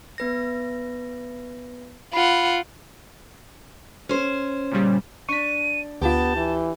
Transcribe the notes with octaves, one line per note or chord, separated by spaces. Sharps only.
B3 B4 A#6
F4 F#5 B5
C#4 C5
A#2 C#3 G3
D4 C#6 B6 D#7
D2 B3 F4 G4 A5
E3